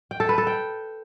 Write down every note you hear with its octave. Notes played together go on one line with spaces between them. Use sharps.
G5
A4
B4
A4
G5